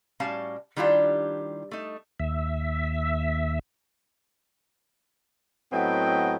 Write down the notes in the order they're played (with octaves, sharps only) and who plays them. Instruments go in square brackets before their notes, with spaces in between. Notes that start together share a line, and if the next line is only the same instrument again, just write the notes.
[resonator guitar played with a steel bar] A2 G3 C#4 F#4 F5 A5
D#3 G3 D4 E4 F4 G4
A3 D#4
[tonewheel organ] D#2 E5
[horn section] A2 F#3 B3 C4 D#5 G5